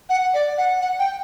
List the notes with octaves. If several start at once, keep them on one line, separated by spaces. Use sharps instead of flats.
F#5
D5
F#5
F#5
G5